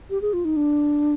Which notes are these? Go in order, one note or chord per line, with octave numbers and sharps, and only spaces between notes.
G4
G#4
F4
D#4
D4